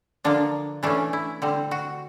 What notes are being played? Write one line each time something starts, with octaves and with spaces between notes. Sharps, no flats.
D3 F3 A#3 D4
E3 A3 C#4 D4
E4
D3 G3 C4
F#4